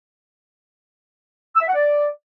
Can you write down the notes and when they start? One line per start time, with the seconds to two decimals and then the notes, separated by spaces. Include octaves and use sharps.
1.55 E6
1.61 E5
1.68 F#5
1.74 D5